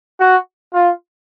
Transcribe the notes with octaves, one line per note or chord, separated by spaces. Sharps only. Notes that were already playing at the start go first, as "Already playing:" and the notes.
F#4
F4